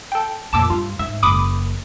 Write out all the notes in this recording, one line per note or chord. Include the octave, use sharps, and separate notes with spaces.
A4 G5
F2 A#2 A5 D6 E6
G2 F4
G#2 E5
F#1 B5 D6 D#6